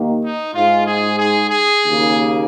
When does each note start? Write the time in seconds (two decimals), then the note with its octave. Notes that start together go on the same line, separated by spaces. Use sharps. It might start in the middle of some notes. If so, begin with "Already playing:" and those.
Already playing: D#2 D#3 A#3
0.23 D#4
0.54 G#2 G#3 F4
0.87 G#4
1.19 G#4
1.50 G#4
1.83 D#2 C#3 A#3